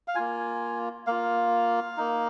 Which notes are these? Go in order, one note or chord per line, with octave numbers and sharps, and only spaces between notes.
F5
A#3 F4 G#5
A#3 F4 F5
A#3 D#4